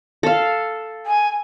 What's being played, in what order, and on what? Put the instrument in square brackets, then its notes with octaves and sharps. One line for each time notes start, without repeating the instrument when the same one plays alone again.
[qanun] A4 F5
[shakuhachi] G#5